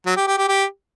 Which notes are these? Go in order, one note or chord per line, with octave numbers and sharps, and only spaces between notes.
F#3
G4
G4
G4
G4